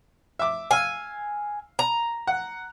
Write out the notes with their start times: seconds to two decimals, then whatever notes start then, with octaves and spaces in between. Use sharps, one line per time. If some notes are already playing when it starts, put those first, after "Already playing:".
0.39 E5 D6
0.71 F5 G#5 E6
1.79 A#5
2.27 F#5